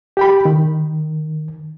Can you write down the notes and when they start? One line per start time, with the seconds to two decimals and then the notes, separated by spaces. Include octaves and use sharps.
0.17 G4 G5 B5
0.45 D#3